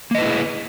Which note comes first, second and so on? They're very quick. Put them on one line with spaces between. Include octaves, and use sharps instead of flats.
A#3 D#5 B4 E4 G#4